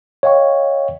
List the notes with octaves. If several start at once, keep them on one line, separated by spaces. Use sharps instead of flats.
C#5 D#5 F5 G5 C#6